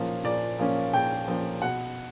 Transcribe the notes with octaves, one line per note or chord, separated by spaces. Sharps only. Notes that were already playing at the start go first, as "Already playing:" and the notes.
Already playing: A#2 F3 A#3 C#4
A#2 D5
F3 A#3 C#4
A#2 G5
F3 A#3 C#4
B2 F#5